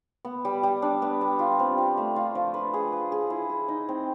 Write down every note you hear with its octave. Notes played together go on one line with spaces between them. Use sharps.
B3
G3
G3
D4
B3
G3
F4
C4
F4
A3
F4
F3
B4
G#4
B4
G#4
E4
G#4
D#4
C4